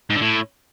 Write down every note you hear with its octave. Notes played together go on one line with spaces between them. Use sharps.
G#2
D3
A2